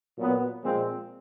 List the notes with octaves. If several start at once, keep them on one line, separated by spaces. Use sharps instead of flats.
A#2 F#3 B3
A#2 F3 G#3 C4